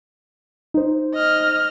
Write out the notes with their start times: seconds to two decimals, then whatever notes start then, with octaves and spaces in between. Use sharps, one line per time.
0.74 D#4 C5
1.15 D#5 F6